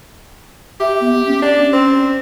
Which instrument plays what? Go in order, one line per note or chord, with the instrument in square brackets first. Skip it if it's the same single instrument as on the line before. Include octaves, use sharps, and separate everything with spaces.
[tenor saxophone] G4 [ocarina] E5
[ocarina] B3
C#4
[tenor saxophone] D4
C4